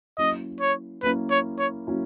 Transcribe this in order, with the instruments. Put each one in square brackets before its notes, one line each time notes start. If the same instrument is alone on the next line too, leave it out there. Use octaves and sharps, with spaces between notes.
[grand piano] F#3 A#3 C#4 E4 [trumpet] D#5
[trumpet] C#5
[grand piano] F#3 A#3 C#4 E4 [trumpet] B4
[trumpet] C#5
C#5
[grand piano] F#3 A#3 C#4 E4